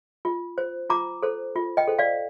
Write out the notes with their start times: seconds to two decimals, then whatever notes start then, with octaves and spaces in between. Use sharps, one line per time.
0.25 F4
0.58 C5
0.90 F4 A#5 D6
1.23 A4 C5
1.55 F4
1.77 D#5 G5
1.88 A4 C5
1.99 D5 F5